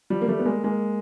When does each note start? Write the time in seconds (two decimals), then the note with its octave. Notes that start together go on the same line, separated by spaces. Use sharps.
0.10 F3 G3
0.22 A#3
0.28 G3 A3
0.39 B3
0.46 G#3 A#3
0.64 G#3 A#3